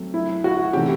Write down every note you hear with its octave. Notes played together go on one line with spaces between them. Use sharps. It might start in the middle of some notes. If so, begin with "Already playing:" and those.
Already playing: F#3 A3 C4
E4
F#4
C3 E3 A3 G4